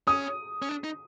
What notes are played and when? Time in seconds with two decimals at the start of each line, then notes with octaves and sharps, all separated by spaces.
0.07 C#4 D#6
0.62 C#4
0.69 D4
0.84 D#4